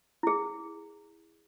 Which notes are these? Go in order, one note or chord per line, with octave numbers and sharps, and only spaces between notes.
E4 G#4